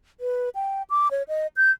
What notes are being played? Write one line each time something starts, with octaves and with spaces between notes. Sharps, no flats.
B4
G5
D6
C#5
D#5
G6